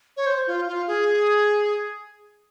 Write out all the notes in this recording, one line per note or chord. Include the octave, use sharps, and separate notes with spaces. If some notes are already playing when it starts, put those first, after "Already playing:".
C#5
C5
F4
F4
G#4